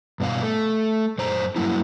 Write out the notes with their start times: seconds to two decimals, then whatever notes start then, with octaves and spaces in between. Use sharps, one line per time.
0.20 G2 B2 F5
0.43 A3
1.18 F#2 C5 A#5
1.56 G2 F#3 A#3 E4